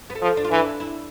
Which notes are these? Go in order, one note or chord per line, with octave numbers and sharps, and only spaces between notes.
B3
A3
F3
D4
F4
E3 E4
D4
E4